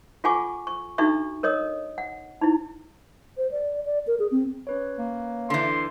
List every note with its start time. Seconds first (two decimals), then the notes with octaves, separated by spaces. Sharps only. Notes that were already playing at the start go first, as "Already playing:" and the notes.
0.24 F4 A4 F#5 G#5 C#6 D6
0.67 C#6
0.98 D4 D#4 F#4 A4 E5 C#6
1.43 A#4 C#5 D#5 D#6
1.98 F#5
2.41 D#4 E4
3.37 C5
3.51 D5
3.85 D5
4.07 A#4
4.19 G#4
4.31 C4
4.67 C#4 B4 C#5
4.99 A#3
5.50 D3 E3 A5 C6 G6